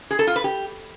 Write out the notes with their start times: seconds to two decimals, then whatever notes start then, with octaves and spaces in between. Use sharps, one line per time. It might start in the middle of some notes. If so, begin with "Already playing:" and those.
0.11 G#4
0.19 A4
0.27 F4
0.36 B4
0.44 G4